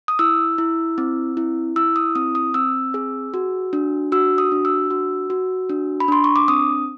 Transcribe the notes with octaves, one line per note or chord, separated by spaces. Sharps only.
D#6
E4 E6
E4
C4
E4
E4 E6
D#6
C4 D#6
D#6
C4 E6
G#4
F#4
D4
F#4 E6
D#6
D4
E6
F#4
F#4
D4
B5
D4 C6
C#6
D6
C4 D#6